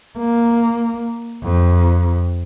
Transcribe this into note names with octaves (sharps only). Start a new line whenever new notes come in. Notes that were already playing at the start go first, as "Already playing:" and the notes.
A#3
F2